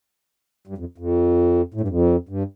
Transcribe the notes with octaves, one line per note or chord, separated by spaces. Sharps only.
G2
F2
F2
A2
G2
F2
G2